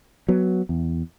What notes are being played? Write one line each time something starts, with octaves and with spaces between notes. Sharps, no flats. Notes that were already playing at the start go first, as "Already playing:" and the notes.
F#3 B3
E2